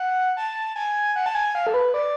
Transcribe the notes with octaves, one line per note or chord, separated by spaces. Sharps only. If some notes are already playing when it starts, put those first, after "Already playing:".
Already playing: F#5
A5
G#5
F#5
A5
G#5
F5
A4
B4
D5